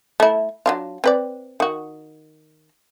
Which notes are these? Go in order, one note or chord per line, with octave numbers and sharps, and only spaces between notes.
A3 E4
F#3 D4 F4
C4 B4 D5
D#3 F#4